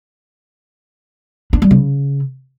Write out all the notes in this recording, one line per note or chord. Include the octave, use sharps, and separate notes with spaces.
D4
G3
C#3